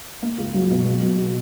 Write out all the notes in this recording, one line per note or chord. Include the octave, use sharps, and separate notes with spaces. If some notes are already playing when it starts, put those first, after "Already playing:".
A#3
C#2
F#3
B2
F#3
F#3
F#4